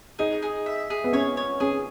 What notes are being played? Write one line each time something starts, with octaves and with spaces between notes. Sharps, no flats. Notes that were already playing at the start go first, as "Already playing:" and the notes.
D#4 G#4
G#4
E5
G#4
B3
C#4 C#5
C#5
C#4 G#4